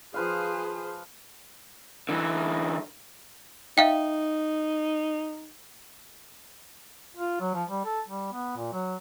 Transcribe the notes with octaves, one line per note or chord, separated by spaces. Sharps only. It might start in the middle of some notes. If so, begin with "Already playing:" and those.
F3 G#4 B4 C5 F5
D3 E3
D#4 E5 F5 G5
F4
F#3
F3
G3
A4
G3
B3
A#2
F#3